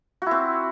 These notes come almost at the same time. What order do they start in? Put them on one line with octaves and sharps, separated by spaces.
F#4 E4 C4